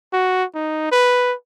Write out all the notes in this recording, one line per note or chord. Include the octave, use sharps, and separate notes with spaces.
F#4
D#4
B4